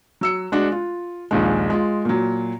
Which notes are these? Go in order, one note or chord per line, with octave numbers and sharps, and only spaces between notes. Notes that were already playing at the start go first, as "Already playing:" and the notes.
F#3 E6 C#7
G#3 D4 F#4
F4
A#1 D#2 G#3
G#3 F4
A#2 F#3